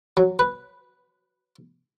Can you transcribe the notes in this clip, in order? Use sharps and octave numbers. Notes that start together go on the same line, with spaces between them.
F#3
B4